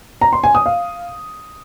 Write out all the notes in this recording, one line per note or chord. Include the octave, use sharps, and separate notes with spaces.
A#5
C6
G#5
D#6
F5